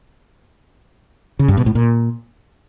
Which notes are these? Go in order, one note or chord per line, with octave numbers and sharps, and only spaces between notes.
C#3
G2
B2
A2
A#2